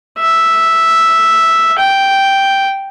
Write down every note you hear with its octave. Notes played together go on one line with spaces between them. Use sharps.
E5
G5